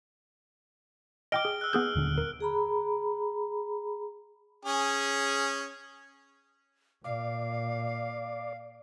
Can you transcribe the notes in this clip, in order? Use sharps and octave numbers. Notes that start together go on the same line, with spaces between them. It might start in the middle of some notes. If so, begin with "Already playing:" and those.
D#5 G5 D6 F6 D7 G7
G#4
E6 F#6
B3 G#4 G6
D#1 D3 D4
A#4
G#4 A#5 B5
C#4 G#4
A#2 D5 F5